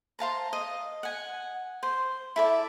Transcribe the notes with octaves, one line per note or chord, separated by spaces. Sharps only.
C5 F5 A5 A#5
D#5
F#5 G#5
C5
E4 A4 D5